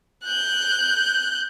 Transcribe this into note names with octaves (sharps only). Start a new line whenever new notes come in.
F#6 G6